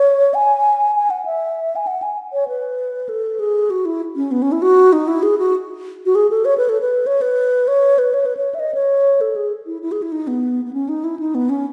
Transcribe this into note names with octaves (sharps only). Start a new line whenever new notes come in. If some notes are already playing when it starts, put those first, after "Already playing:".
Already playing: C#5
G#5
G#5
F#5
E5
G#5
F#5
G#5
C#5
B4
A4
G#4
F#4
E4
C#4
B3
C#4
E4
F#4
D#4
E4
G#4
F#4
F#4
G#4
A4
C#5
B4
A4
B4
C#5
B4
C#5
B4
C#5
B4
C#5
E5
D#5
C#5
A4
G#4
E4
E4
G#4
E4
D#4
B3
B3
C#4
D#4
E4
D#4
B3
C#4